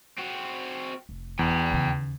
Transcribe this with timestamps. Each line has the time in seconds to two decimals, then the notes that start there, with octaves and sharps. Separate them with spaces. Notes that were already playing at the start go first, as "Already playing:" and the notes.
0.18 C4 F#4
1.09 F1
1.39 E2 G5 B5
1.71 D#2 C#3